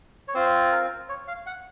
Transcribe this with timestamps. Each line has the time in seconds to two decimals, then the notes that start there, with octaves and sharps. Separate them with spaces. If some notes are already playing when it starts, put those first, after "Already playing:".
0.28 C#5
0.34 C4 F4 C5
0.72 A#4
1.09 C#5
1.27 F5
1.46 F#5